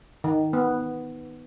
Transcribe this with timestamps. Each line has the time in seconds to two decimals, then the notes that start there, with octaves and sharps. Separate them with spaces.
0.24 D#3
0.53 B3